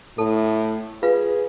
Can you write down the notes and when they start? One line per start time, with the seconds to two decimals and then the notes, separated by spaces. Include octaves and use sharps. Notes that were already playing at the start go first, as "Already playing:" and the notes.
0.18 A2 A4 A5
1.03 F4 G#4 B4 F5